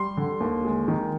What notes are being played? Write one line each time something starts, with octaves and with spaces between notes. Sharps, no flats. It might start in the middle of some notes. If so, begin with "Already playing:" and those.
Already playing: G3 C6
D3
D#2
G#3
D#3